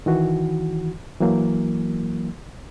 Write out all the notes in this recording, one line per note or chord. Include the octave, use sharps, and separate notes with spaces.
D#3 E3 F#4
E3 F#3 A#3